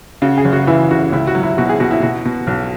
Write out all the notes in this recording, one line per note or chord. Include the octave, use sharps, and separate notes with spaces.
C#3 F#4
G#4
F#1
F#4
E3 E4
C#3 F#4
C#2 E4
F#4
F#3
E4
B2 F#4
G#4
B2 F#4
E4
B2 F#4
B2
B1